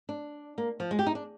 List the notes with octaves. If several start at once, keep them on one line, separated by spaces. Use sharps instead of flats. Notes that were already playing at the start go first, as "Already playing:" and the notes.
D4
A#3
F3
G#3
G4
D#4
D4